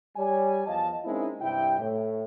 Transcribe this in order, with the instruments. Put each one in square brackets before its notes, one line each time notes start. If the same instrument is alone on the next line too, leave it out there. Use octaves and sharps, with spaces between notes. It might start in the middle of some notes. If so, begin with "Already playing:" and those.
[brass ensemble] G3 C#5 G#5
E2 F3 D#5 F5 A5
G#3 A#3 C4 C#4 D#4 E4
G2 C3 E4 G5
A2